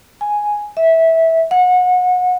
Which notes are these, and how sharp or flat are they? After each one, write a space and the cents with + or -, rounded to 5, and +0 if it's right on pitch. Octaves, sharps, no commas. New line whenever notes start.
G#5 +0
E5 -15
F#5 -30